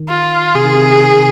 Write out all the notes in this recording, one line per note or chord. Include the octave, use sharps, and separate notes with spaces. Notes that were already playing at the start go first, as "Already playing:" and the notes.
Already playing: D#3
F4
C3 G#4
D#3
C3
D#3
C3
D#3
C3